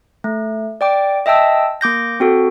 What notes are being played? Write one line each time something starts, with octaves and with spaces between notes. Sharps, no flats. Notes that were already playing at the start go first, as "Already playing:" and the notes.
A3
D5 G5 D6
D#5 E5 G5 A5 E6
A#3 D6 G6 A#6
C4 F#4 A4